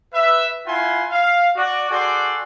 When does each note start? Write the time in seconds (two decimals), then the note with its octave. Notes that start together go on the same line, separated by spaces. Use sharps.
0.13 B4 E5
0.67 E4 F4 F#5 G#5 B5 C6
1.10 F5
1.56 F#4 D5
1.90 F#4 G#4 A4 D5 G5 C6